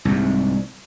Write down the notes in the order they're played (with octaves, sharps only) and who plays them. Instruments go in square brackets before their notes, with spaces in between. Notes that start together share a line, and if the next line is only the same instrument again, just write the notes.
[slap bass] C2 G#2